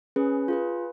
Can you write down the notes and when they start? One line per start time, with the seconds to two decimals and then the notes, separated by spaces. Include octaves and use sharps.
0.16 C#4 G#4 B4
0.48 F4 G#4 B4